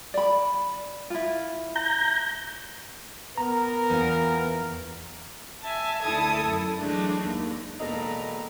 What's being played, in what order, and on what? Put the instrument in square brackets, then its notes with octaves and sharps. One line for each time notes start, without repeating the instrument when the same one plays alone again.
[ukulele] D5 B5
E4 F4
[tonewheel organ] A#5 G6
[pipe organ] B3 [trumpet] A#4 [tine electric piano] A#5
[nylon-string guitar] E2 F4
[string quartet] E5 G#5 A5
D2 E4 A4 A5 D#6 G#6
F#2
E3 F#3 G#3 A3 D4
D#2
[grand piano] E1 A4 [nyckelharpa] A#3 B4 [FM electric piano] D#5 [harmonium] A#5